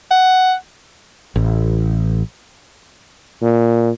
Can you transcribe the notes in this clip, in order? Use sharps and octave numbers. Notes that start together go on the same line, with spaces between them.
F#5
A1
A#2